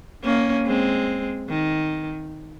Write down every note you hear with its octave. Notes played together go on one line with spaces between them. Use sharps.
A#3 C#4
G#3 C4
D#3